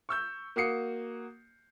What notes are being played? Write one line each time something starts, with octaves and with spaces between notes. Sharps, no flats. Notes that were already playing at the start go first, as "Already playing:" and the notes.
C#6 E6 G6
A#3 F#4 D#6 C7 C#7